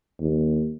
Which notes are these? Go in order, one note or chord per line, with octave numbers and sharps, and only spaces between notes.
D#2